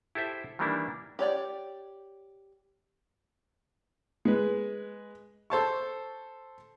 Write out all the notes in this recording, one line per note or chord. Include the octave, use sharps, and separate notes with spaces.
E4 G4 A4 C5 E5
D#3 E3 G3 A#3 D4 E4
G4 C#5 D5 G5
G#3 B4
A4 C5 A5 C#6